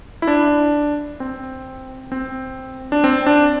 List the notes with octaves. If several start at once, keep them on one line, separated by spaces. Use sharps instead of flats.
E4
D4
C4
C4
D4
C4
D4